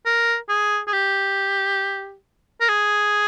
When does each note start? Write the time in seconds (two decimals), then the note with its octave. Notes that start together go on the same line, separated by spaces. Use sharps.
0.06 A#4
0.49 G#4
0.87 G#4
0.93 G4
2.60 A#4
2.68 G#4